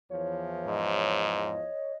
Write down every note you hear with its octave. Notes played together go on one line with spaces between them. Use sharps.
E2 E3 F3 C#5
G#2 D#5